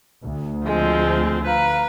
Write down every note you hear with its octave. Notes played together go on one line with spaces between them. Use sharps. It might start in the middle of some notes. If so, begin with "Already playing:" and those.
D2
F3 G#3 C4 G#4
B4 F5 A#5